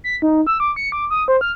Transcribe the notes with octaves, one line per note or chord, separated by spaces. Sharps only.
B6
D#4
E6
D6
C#7
D6
D#6
C5
F6